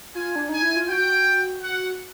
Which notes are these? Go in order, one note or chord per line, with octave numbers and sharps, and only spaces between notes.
F4 G#5
D4
D#4 G#5
E4
F4
F#4 G5
F#5